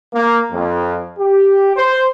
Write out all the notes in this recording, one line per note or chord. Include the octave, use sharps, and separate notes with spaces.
A#3
F2
G4
C5